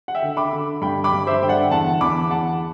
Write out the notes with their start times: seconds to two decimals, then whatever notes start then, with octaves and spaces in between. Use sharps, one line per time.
0.08 F#5
0.15 E5 G5
0.22 D3
0.37 B5 D6
0.53 D3
0.81 G2 G5 B5
1.04 B5 D6
1.12 G2
1.27 C5 E5
1.42 D3 G5
1.49 D5 F#5
1.71 E2 F#5 A5
2.01 E2 B5 D6
2.31 E2 F#5 A5